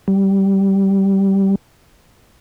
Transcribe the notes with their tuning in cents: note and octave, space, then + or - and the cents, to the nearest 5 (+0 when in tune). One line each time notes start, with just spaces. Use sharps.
G3 -10